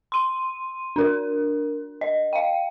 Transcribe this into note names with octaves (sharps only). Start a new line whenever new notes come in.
C6 D#7
D4 A#4
D#5
F5 G5